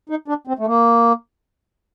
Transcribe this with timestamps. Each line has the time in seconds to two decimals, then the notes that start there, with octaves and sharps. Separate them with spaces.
0.10 D#4
0.28 D4
0.47 C4
0.59 A3
0.67 A#3